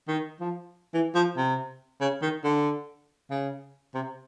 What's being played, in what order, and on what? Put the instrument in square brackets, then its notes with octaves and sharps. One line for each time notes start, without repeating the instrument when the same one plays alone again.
[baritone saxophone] D#3
F3
E3
F3
C3
C#3
D#3
D3
C#3
C3